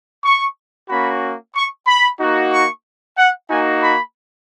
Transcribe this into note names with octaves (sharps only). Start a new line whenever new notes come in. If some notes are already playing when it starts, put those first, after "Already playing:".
C#6
A#3 C#4 F#4 B5
C#6
B5
A#3 D#4 F#4
C#6
F#5
A#3 D#4 F#4 G#5
B5